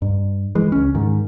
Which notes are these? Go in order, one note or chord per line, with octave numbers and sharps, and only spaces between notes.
G2
E3 G#3
C#2 C#4
G#2 D#3